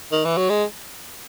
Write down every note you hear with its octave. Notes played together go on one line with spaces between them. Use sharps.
D#3
E3
F#3
G#3